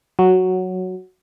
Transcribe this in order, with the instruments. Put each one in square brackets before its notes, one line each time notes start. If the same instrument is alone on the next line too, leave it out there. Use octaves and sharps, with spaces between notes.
[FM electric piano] F#3